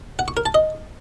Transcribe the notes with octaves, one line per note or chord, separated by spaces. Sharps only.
F#5
C#6
A#4
A5
D#5